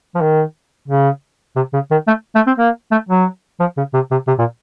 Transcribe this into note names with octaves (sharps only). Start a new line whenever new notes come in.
F3
D#3
C#3
C3
C#3
D#3
A3
A3
C4
A#3
A3
F#3
F3
C#3
C3
C3
C3
A#2